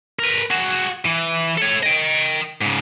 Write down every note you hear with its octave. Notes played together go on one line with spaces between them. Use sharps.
A#4 B4
F#4 G#4
E3
A4 C#5
D#5 G5
G#2 C#3